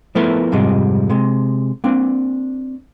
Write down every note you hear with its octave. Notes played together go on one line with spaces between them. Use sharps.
F3 A3 B3 E4 A#4 B4
F2 G#2 C3 G3 G#3
C3 G#3
A#3 C4 D4